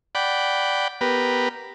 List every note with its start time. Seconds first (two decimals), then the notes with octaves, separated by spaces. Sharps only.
0.15 D5 F#5 G5 B5
1.01 B3 G4 A#4 B4